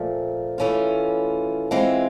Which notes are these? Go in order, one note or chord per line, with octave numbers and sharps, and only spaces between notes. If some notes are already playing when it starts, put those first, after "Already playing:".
Already playing: A#2 F3 A3
E3 A3 C#4 F4
E3 G#3 C4 F4